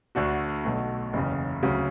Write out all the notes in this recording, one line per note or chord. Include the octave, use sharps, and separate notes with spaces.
D2 D3 A3 D4 F#4
B1 B2 A3
F#1 E2 C#3
D2 C#3 F#3